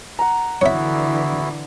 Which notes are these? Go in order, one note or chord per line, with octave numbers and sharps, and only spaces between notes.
F#5 A#5
D3 E3 B3 E4 F#4 C#5 E5